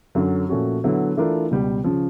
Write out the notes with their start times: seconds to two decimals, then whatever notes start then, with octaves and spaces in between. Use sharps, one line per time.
0.15 F#2 D3 F#3
0.49 A#2 F3 A3 C#4 F#4
0.84 D3 F#3 B3 E4
1.17 E3 A3 D4 F4 A#4
1.51 C#2 B2 G3
1.84 C#3 F3